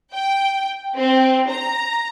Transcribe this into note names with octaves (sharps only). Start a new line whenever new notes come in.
G5
C4
A#5